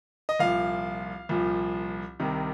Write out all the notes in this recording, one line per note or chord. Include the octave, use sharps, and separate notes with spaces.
D#5
C2 A#2 F3 F5
C2 A#2 F3
C2 C3 D#3